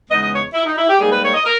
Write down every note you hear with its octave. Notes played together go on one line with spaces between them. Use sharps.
E2 C#3 G#3 B3 D#4 D#5
D#5
C#5
E4
D#4
E4
G4
G#2 G3 A#3 D#4 G#4
B4
C#5
D#5
A#4